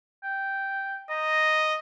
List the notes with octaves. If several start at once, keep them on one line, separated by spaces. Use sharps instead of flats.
G5
D#5 A#5